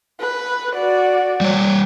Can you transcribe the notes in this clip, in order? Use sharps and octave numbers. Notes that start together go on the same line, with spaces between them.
B4
F#4 D5
G3 C#5